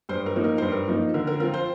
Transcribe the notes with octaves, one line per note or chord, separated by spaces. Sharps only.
G2 C5
A#4
F3 A#3 D#4
A#4
G2 C5
A#4
F3 A#3 D#4
D3 A#4
A#4
F3 C4 F4 A#4
C5